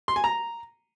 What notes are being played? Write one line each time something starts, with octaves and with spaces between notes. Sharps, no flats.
C6
G#5
A#5